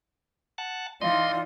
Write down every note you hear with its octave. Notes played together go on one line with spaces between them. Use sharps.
F#5 A5
E3 D#4 F4 D5 D#5 F5 C6